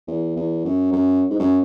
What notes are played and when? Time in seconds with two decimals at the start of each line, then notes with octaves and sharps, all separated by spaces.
0.08 E2
0.36 E2
0.65 F#2
0.93 F#2
1.30 G#2
1.40 F#2